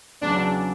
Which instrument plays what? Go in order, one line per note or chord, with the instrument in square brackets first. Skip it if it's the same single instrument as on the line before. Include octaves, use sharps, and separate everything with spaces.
[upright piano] E2 C#3 F#3 [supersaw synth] D4